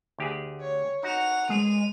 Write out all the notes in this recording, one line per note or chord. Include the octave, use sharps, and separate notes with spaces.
D2 G4 G#4
C#5
D#4 F#4 F#5 F7
G#3 G#4 D#7 F7